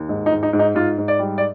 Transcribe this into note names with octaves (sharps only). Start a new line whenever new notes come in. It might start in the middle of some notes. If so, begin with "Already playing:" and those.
Already playing: D#2
G#2
D#4
G#2
D#4
G#2
D#4
G#2 F4
G#2
D5
G3
D5